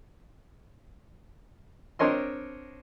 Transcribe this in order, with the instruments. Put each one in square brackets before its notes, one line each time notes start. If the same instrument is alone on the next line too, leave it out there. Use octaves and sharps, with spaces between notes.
[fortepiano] C4 D4 A#4 C#5 D#5 C6